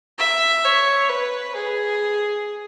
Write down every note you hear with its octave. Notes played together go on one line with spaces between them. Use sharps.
E5
C#5
B4
G#4